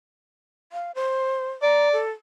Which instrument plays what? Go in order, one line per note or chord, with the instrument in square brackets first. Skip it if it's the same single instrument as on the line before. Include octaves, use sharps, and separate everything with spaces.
[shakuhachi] F5
C5
[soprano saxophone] D5 [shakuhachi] A#5
[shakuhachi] A4